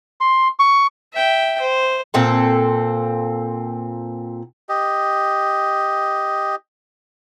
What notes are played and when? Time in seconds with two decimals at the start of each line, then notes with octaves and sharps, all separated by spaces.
0.21 C6
0.59 C#6
1.13 E5 G5
1.61 C5
2.14 A#2 C4 A4
4.69 G4 D#5